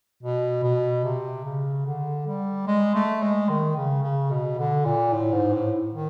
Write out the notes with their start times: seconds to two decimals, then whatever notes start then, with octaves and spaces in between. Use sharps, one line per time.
0.23 B2
0.63 B2
1.04 C3
1.45 C#3
1.86 D3
2.27 G3
2.67 G#3
2.95 A3
3.22 G#3
3.49 D#3
3.77 C#3
4.03 C#3
4.31 B2
4.58 D3
4.85 A#2
5.13 A2
5.33 G#2
5.53 A2
5.94 D#3